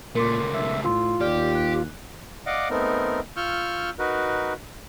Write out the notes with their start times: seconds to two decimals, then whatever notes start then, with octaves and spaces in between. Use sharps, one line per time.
0.15 C#2 A#2 A3 A#4 C6 D6
0.54 B1 E5
0.84 A2 F4 C6 E6
1.21 D#2 G4 D5 F6
1.55 F#6
2.46 D5 D#5 F5 F#5 D6
2.70 A3 B3 C4 D#4 A#4
3.37 F4 C#6 E6 F6 G6
3.99 D#4 F#4 A#4 B4